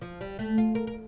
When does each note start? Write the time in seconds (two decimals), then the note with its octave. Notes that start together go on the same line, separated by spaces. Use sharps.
0.01 F3
0.21 G3
0.39 A3
0.58 F4
0.75 A#4
0.87 A#4